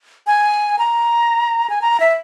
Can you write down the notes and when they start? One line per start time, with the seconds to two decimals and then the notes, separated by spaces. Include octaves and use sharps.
0.27 G#5
0.79 A#5
1.70 G#5
1.82 A#5
2.00 E5